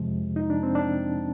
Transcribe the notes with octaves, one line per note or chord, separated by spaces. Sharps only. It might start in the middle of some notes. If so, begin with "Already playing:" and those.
Already playing: F2 C3 F3 G#3
D#4
D4
C4
D4